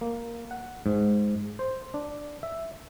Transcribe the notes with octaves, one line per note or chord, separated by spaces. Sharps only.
A#3
F#5
G#2
C5
D4
E5